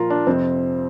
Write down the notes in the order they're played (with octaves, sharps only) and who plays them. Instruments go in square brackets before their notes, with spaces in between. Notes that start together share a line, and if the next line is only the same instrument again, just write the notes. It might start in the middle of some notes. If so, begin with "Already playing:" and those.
Already playing: [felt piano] A#2 F3 F4 A#4
D4
F2 C3 F3 C4